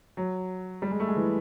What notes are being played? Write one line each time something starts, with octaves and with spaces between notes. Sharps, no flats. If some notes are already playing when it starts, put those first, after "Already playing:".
F#3
G3
G#3
A3
G#3
E3